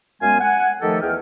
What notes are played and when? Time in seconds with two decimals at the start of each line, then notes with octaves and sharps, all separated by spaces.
0.22 F#2 G#3 B3 F5 G#5
0.41 F#5 G#5
0.82 D#3 F3 A3 G4 A4
1.01 E2 G#4 D#5 G5 F6